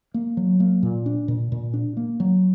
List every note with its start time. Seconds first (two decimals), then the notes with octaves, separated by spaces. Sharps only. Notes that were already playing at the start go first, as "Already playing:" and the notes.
0.14 A#3
0.37 F#3
0.60 A#3
0.83 A#2
1.06 D4
1.28 A#2
1.52 A#2
1.73 D4
1.97 A#3
2.20 F#3